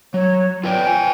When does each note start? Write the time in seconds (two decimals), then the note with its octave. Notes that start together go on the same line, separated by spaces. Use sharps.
0.14 F#3 C#5
0.64 F4 B4 D5 G5
0.87 C5 G#5